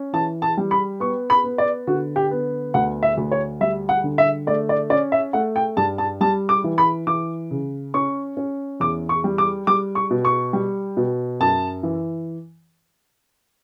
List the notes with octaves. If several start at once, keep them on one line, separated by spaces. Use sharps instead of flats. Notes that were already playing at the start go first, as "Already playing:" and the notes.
Already playing: C#4
E3 A5
A5
G3
B5
B3 C#6
B5
B3
D5
D3 F#4
G4
B3
D2 F#5
E5
D2
C#5
G3 E5
F#5
D3
E5
A3 D5
D5
C#4 D5
E5
A3 F#5
G5
G2 A5
A5
G3 A5
D6
E3
B5
E3 D6
C#3
C#4 C#6
C#4
E2 D6
C#6
G3
D6
G3 D6
C#6
B2
C#6
G3
B2
F#2 A5
E3